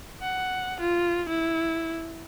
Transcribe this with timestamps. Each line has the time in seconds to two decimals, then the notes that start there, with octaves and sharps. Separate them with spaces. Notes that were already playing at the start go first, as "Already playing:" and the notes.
0.22 F#5
0.80 F4
1.29 E4